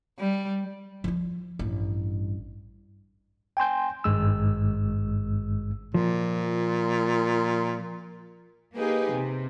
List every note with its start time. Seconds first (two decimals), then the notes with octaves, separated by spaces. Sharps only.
0.19 G3
1.04 F3 F4
1.59 A1 G2
3.57 G5 G#5 C6 G6
4.04 G#1 G2 G#3 E6
5.94 A#2 F3
8.76 A#3 D#4 G4 G#4 B4
9.13 C3